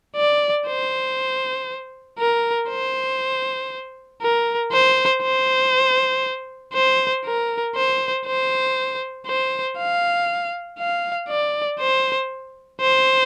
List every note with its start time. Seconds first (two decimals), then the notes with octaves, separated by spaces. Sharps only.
0.17 D5
0.67 C5
2.19 A#4
2.70 C5
4.22 A#4
4.72 C5
5.23 C5
6.74 C5
7.25 A#4
7.76 C5
8.26 C5
9.27 C5
9.78 F5
10.79 F5
11.29 D5
11.80 C5
12.81 C5